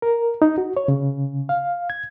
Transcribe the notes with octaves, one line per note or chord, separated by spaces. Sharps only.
A#4
D#4
F#4
C#5
C#3
F5
G#6